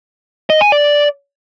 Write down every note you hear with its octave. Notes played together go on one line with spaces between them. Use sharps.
D#5
G#5
D5